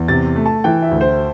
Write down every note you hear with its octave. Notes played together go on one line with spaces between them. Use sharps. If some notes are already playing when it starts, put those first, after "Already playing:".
Already playing: E2
C3 A6
A3
A5
E3 G5
E5
D2
C5